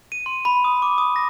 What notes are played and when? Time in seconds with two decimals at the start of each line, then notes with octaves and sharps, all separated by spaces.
0.12 D#7
0.26 C6
0.45 B5
0.64 D#6
0.82 D6
0.98 D#6
1.16 A#6